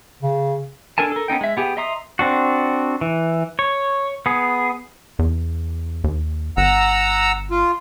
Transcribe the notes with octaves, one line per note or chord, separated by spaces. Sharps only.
C#3
D4 A4 A#4 G#5 A5
A4 A#4
B3 C#4 D#4 G5
G#3 E5
B3 G4 G#4
D#5 E5 A#5 C6 D#6
C4 D4 F#4
E3
C#5
B3 G#4
E2
D#2
G1 F#5 A#5 E6
F4